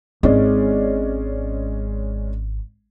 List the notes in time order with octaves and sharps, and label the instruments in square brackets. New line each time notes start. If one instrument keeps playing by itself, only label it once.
[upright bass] G#1 [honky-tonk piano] G#3 C#4 D5